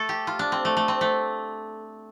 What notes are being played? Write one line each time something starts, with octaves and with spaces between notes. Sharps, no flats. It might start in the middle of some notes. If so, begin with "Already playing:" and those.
Already playing: A3 A4
G4
F4
D4
C4
A3
A3
C4
A3